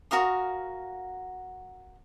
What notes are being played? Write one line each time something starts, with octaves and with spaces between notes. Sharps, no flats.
F#4 A#4 F5 D#6